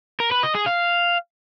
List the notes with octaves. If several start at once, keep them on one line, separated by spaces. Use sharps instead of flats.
A#4
B4
D#5
G#4
F5